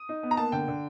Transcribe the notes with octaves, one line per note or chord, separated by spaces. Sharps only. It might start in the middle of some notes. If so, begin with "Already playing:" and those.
Already playing: D#6
D#4
B3
A#5
A#3 A5
D3 G5
D3